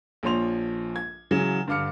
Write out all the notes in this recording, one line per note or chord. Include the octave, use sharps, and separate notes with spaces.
A#1 F3 C#5 C6 F7
G#6
C#3 E3 F#3
G2 D3 F5 D6 F6 C#7